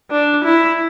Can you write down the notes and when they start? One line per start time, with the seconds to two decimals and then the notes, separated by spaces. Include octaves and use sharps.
0.11 D4
0.44 E4